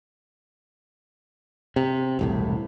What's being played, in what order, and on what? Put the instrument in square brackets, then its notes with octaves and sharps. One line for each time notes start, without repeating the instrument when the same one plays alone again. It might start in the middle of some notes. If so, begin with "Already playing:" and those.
[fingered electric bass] C3
E1 C2 A2